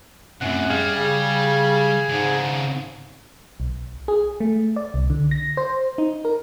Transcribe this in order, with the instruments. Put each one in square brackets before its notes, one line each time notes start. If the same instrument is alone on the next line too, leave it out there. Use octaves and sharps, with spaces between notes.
[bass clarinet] F#2 [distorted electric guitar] A2 C3 [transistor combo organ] F#5
[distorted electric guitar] G3 [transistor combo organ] G#4 F5
[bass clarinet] C#3 [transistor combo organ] G#4
[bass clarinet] G#2 [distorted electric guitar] C#3 D4
[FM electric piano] B1
G#4
A3
D5
C2
D3
A#6
C5
D#4
A#4